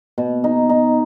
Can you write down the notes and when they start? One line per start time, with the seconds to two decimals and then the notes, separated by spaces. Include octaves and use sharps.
0.18 B2
0.44 D#4
0.69 D#4